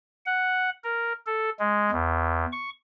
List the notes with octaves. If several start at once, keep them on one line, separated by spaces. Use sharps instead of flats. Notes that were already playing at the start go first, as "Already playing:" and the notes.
F#5
A#4
A4
G#3
E2
C#6